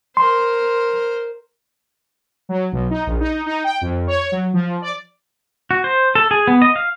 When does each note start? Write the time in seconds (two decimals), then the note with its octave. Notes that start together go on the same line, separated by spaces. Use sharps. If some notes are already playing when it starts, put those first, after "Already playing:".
0.17 A#4 C5 C6
2.49 F#3
2.72 B1
2.90 D#4
3.06 A#1
3.20 D#4
3.46 D#4
3.64 G5
3.81 F2
4.07 C#5
4.32 F#3
4.54 F3
4.82 D5
5.71 F#4
5.84 C5
6.15 A4
6.31 G#4
6.48 B3
6.62 D#5
6.76 F5